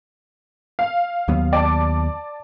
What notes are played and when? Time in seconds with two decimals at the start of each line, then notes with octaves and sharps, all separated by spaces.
0.79 F5
1.28 D#2 F#3 B3
1.53 D5 A5